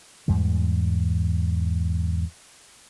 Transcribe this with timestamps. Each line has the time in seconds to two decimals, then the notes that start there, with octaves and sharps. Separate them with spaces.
0.28 E2 G#2 G3